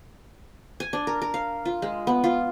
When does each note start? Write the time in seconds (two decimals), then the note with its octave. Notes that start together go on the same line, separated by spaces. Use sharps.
0.80 G#5
0.93 D4
1.07 A#4
1.22 A#4
1.34 F5
1.65 F4
1.82 G#3
2.07 B3
2.24 F4